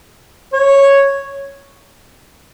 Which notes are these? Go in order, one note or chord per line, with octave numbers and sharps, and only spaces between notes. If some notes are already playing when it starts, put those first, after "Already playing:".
C#5